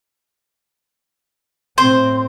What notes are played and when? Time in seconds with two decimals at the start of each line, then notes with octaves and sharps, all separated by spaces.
1.78 A2 C4 C5